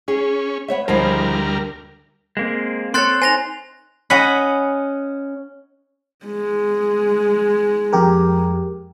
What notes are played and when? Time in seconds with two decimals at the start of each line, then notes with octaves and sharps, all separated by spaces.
0.08 C#4 G#4
0.68 B3 C#5 E5
0.88 D2 F3 G3 G#3 E4 A#4
2.37 G#3 A#3 C4
2.94 C4 A4 C#5 C6 F#6 A6
3.22 D#4 C5 G#5 A#6 F7
4.10 C#4 D#5 F#5 B5
6.25 G#3
7.93 F2 G4 A#4